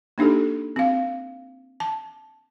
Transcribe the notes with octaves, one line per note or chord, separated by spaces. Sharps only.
A#3 D4 D#4 G4 A4
C4 F5
A5